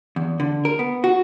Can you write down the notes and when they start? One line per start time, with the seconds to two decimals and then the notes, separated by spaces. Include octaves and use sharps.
0.16 E2
0.40 D3
0.65 A#4
0.79 B3
1.04 F#4